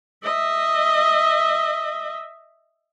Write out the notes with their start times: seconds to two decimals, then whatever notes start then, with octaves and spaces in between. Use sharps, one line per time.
0.23 D#5 E5